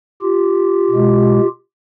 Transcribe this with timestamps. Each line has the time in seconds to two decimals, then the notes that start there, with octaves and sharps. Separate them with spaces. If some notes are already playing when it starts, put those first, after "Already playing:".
0.22 F4 G4
0.91 B2 G#3